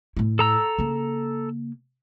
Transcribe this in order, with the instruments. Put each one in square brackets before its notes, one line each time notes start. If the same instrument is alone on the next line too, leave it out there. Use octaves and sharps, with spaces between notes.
[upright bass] A2 E4
[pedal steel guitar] A4 A#5 E6
[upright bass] C#3 A#3